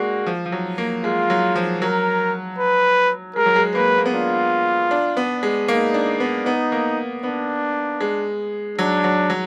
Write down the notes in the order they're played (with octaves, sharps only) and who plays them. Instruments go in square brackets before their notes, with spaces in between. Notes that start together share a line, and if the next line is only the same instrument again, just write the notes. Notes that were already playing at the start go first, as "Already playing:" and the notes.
Already playing: [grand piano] G#3 A#3 D4 [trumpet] F#4
[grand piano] F3
F3
F#3
A#3
[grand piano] G#3 [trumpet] F4
[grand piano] F#3
F3
[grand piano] F#3 [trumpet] A#4
[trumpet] B4
[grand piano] G#3 [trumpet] A#4
[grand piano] F#3
G#3
[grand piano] A#3 [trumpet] B4
[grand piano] A#3
B3
[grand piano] D4 [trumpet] F4
[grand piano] D4
B3
G#3
[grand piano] A#3 [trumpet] D#4
[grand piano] D4
B3
[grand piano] B3 [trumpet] D#4
[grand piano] A#3
[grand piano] B3 [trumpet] D4
[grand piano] G#3
[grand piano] F#3 [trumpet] D4
[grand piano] F#3
F#3